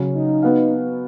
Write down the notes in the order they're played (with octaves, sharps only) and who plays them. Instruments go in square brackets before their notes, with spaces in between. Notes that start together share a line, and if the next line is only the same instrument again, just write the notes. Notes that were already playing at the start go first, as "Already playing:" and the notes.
Already playing: [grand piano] C#3 F#3 C#4
[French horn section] D#4
[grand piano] B3 F#4 B4 F5